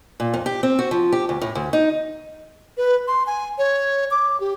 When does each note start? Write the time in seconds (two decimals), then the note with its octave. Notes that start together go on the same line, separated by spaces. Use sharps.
0.20 A#2
0.34 F2
0.46 G4
0.63 C4
0.79 F#4
0.91 F3
1.12 G4
1.29 D2
1.42 A2
1.55 D2
1.73 D#4
2.77 B4
3.08 C6
3.27 G#5
3.58 C#5
4.11 D6
4.40 G4